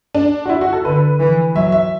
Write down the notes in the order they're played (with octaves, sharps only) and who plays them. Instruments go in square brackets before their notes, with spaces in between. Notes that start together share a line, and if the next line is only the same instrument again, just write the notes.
[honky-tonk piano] D4
F#4
E4
F#4
A4
[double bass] D3 [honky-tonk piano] B4
[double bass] E3
[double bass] F#3 [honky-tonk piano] E5
[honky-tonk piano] E5